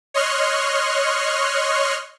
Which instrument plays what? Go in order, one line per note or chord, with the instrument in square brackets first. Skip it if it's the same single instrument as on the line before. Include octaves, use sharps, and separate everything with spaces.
[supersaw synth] C#5 D#5 C6 C#6 F6 F#6